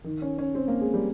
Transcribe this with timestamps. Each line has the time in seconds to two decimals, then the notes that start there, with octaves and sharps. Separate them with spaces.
0.04 D#3
0.22 C#4
0.38 C#4
0.55 C4
0.68 A#3
0.81 G#3
0.94 G3